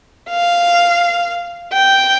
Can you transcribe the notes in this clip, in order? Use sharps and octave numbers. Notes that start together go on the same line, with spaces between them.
F5
G5